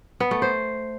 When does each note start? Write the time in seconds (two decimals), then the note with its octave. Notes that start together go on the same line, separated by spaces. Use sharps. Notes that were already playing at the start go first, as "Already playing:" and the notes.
0.20 B3
0.31 A3
0.42 C5